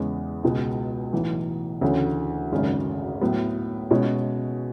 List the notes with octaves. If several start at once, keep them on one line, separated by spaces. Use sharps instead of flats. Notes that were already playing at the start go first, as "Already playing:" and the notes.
Already playing: E2 C#3 G#3 B3
C#2 B2 G#3
B1 A2 E3
D2 C#3 E3 A3 C#4
G#1 F#2 C#3 G#3
A2 F#3 B3
B2 G#3 C#4